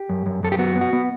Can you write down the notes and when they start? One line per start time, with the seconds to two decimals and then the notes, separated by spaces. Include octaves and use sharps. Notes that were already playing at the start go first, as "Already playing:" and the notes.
Already playing: G4
0.09 F#2
0.26 F#2
0.43 F#2 A4
0.52 G4
0.59 B3 F#4
0.76 B3
0.81 F#4
0.93 B3